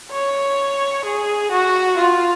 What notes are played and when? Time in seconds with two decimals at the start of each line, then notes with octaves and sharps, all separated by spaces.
0.12 C#5
1.05 G#4
1.51 F#4
1.97 F4